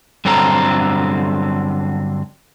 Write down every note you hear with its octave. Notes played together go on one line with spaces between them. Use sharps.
G2 D3 F#3 C4 A4 A#5